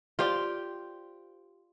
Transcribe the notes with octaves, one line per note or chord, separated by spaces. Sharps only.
F4 G4 C5 D5